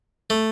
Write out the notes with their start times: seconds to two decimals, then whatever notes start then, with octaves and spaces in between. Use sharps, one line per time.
0.30 A3